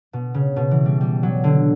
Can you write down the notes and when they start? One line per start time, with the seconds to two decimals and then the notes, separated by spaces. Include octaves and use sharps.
0.13 B2
0.34 C#3
0.56 B2
0.71 E3
0.86 G3
1.01 G3
1.23 F#3
1.44 D3